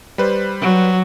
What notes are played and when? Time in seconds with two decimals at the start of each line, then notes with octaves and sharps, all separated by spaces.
0.18 G3 B4 C5
0.60 F#3